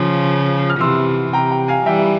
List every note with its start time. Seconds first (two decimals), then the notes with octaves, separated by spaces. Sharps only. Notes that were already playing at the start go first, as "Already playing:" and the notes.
Already playing: C#3 F3 C6
0.70 F6
0.80 C3 E3 C6 E6
1.33 C3 G5 A#5
1.51 G5 A#5
1.68 F5 G#5
1.86 E3 G3 E5 G5